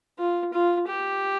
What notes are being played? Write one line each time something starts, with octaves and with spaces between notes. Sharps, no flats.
F4
F4
G4